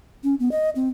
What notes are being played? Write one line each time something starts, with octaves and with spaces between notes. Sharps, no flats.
C#4
B3
D#5
C4